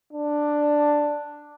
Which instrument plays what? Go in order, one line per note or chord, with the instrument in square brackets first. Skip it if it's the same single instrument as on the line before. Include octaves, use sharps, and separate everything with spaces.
[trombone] D4